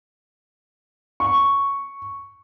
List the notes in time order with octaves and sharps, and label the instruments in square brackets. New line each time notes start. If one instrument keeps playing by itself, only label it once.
[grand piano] C#6